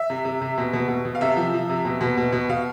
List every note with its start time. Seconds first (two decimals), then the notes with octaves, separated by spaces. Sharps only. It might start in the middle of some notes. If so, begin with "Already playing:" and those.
Already playing: E5
0.10 C3
0.25 C3
0.42 C3
0.58 B2
0.73 B2
0.89 B2
1.05 B2
1.15 F5
1.21 C3 E5
1.36 F3
1.53 F3
1.70 C3
1.85 B2
2.01 B2
2.18 B2
2.33 B2
2.49 B2 F5